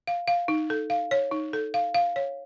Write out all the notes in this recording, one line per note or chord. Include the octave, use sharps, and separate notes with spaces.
F5
F5
D#4
A4
F5
C#5
D#4
A4
F5
F5
C#5